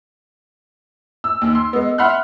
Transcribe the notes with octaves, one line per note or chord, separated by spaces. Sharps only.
E6
D#2
C6
G#3 B3
E5 F#5 B5 C6 F6 F#6